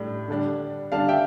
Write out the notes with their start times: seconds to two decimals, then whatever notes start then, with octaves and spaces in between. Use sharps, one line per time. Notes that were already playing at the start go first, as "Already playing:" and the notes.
Already playing: A2 G3 D4
0.28 D3 G3 D4
0.92 D3 G3 D4 F5 A5
1.08 E5 G5